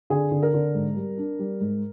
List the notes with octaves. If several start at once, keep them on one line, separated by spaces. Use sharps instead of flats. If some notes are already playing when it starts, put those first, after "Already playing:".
D3 G#4
D3
A#4
D3
G#2
G3
D4
G3
G#2